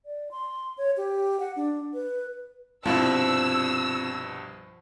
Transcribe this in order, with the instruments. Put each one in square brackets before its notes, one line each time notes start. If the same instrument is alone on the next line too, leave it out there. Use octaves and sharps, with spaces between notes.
[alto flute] D5
C6
C#5
G4
F#5
D4
B4
[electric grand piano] C2 G2 B2 [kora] F3 E4 [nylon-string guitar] C4 F4 [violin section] E6